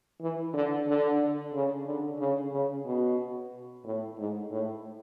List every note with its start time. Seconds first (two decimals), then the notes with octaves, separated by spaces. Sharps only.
0.21 E3
0.54 D3
0.87 D3
1.54 C#3
1.86 D3
2.19 C#3
2.52 C#3
2.85 B2
3.85 A2
4.18 G#2
4.51 A2